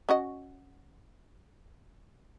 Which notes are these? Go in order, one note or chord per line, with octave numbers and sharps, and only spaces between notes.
C#4 F#4 D#5